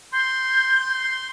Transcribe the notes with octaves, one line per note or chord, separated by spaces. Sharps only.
C6 G6